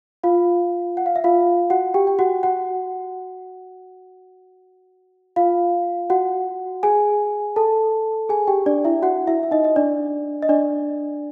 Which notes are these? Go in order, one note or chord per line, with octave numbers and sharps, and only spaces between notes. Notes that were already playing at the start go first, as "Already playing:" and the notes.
F4 F5
F#5
F5
E5
F4 F5
F#4 F#5
G4 G5
G5
F#4 F#5
F#4 F#5
F4 F5
F#4 F#5
G#4 G#5
A4 A5
G#4 G#5
G4 G5
D4 D5
E4 E5
F#4 F#5
E4 E5
E5
D#4 D#5
D#5
D4 D5
D#5
D4 D5